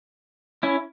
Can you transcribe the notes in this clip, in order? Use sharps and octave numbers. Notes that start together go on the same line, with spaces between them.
C#4 E4